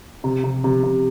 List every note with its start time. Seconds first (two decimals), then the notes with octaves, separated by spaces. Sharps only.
0.24 C3
0.44 C3
0.64 C3
0.84 C3